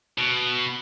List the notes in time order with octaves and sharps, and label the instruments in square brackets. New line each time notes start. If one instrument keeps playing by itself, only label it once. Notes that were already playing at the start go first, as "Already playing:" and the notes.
[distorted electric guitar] B2